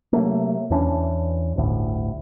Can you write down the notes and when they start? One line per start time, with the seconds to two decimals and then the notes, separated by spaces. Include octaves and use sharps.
0.13 C3 F#3 A3 A#3
0.70 E2 E3 C#4 D4
1.56 G1 D2 A2